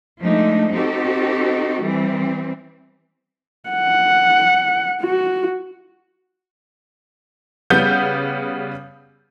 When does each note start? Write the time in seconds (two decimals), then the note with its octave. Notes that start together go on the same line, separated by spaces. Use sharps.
0.20 F3 G#3 A3 D4 D#4
0.74 C4 D#4 F#4 G4 A4
1.82 E3 G3 C4
3.69 F#5
5.01 F#4
7.70 C#3 G3 B3 G6